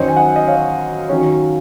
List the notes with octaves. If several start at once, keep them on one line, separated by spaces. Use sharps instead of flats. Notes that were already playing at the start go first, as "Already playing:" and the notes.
Already playing: F#2 D#3 F#3 C#4 C5 D#5
G#5
D#5 F#5
D#5
C#5 F5
D#3 F#3 C#4